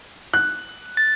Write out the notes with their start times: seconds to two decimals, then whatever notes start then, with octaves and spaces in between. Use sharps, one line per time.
0.34 F#6
0.97 A6